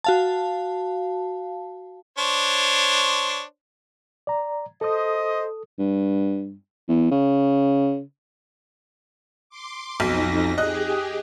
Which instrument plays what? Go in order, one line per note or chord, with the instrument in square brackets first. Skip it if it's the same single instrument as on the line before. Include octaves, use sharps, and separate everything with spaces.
[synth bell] F#4 F5 A5
[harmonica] D4 C5 C#5
[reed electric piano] D5 A#5
[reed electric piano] A4 D#6 [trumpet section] C5 D#5
[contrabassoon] G2
E2
C#3
[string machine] C6 D6
[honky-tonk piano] B1 [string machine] F2 D#4 A#6
[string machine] G4 G#4 [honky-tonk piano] D#5 F#6